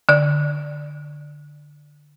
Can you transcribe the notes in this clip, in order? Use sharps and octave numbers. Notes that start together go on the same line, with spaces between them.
D3 D5